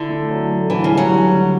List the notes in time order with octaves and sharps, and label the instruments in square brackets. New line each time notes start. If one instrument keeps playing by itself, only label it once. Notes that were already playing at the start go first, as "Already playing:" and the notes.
Already playing: [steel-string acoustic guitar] D3 [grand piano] E4
[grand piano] A3
F#3
A3
[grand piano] D3 [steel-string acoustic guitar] E3
[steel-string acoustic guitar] C#3
[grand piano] G3
[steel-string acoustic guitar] F#3
[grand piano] G3
D3